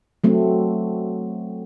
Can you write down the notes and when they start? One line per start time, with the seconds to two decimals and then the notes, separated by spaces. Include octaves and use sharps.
0.24 F#3 A3 C4